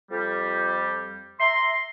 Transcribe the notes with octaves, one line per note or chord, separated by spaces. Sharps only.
F2 G3
E5 A#5 C6